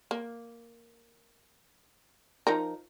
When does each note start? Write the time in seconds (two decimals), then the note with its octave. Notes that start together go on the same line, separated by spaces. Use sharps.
0.11 A#3
2.47 F3 D#4 A#4